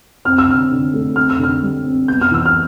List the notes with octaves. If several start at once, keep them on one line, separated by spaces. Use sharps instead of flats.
C4 F6
E6
D3 F6
D3
A3
C4 F6
E6
D3 F6
G3
C4
B3 G6
F6
E3 E6
F6